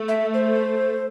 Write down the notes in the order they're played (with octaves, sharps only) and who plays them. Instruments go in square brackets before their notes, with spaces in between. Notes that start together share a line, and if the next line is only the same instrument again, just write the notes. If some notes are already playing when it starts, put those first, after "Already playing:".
Already playing: [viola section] A3
[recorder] E5
C5